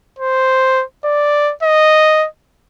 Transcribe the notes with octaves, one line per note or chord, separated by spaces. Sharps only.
C5
D5
D#5